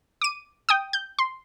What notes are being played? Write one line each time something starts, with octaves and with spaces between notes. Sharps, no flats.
D6 D#7
G5 D#6
G6
C6